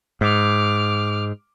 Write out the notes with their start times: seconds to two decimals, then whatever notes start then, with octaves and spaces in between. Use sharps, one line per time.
0.21 G#2 D6 F6